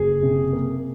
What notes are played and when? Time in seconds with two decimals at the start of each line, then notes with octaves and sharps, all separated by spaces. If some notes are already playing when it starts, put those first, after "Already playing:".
Already playing: F#1 G#4
0.23 C3
0.53 A#3